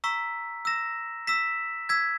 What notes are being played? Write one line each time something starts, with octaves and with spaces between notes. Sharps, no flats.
A#5 C#6 E6 B6
E6 A#6 E7
E6 B6 E7
E6 G#6 B6